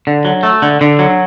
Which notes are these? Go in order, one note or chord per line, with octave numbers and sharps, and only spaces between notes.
D3
F#3
A3
D3
D3
F#3